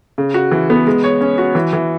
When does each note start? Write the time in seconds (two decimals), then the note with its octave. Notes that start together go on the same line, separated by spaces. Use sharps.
0.18 C#3
0.34 F#4
0.52 E3
0.70 B3
0.87 G#3
1.04 C#5
1.21 C#4
1.38 F#4
1.55 E3
1.73 E3